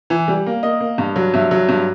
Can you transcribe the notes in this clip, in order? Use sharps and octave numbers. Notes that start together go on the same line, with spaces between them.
E3
G3
A#3
A#3 D#5
A#3
G2
F#3
G2 E5
F#3
G2